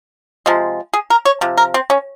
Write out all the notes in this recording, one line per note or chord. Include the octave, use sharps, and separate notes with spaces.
C3 F3 G#3
G#4
A#4
C#5
C3 F3
A#4
C4
C#4